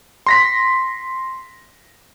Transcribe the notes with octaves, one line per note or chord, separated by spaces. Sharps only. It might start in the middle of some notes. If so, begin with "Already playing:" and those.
C6 A#6 B6